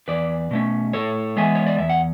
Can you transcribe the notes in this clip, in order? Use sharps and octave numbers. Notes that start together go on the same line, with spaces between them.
E2 B4 D5
B2 A3 C#4
A2 A4 C#5
E3 G#3 B3 E5 G#5
C#5
D5
E2 E5
F#5